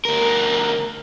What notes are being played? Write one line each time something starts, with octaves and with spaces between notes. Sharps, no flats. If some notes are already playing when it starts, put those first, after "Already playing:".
D2 A#4